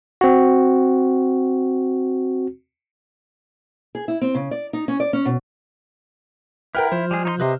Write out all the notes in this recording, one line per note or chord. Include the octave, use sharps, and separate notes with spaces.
C4 F#4
G#4
E4
C4
C#3
D5
D#4
C#4
D5
C#4
B2
E4 A#4 B4 F#5 G5 F6
F3 C5
G3 G#3 G#4
D#4 C#5 C6
C3 B4 D#5 C6